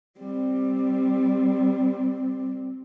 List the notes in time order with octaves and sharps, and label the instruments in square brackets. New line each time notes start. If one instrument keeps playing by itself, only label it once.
[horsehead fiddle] G3 C4